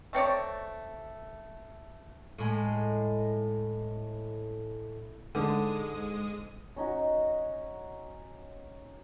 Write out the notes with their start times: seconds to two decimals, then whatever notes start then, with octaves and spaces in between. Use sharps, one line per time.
0.13 A3 C4 C#5 D5
2.38 A2 G#3
5.35 G#2 D3 G#3 D#6
6.76 C#4 D#4 F#4